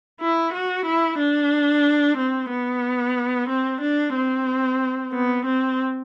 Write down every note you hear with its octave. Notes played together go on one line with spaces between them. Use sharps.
E4
F#4
E4
D4
C4
B3
C4
D4
C4
B3
C4